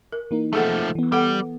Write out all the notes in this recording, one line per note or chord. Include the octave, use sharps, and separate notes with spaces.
A#4
E3 A#3 D#4
F3 A3 G#4 A4 F#5
E3 B3
G3 A4 F#5